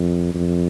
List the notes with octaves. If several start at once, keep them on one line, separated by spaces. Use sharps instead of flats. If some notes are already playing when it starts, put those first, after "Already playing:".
Already playing: F2
F2